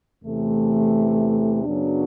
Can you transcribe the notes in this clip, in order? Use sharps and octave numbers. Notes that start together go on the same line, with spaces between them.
E2 C3 E3 A3
F#2 C#3 F#3 B3 D4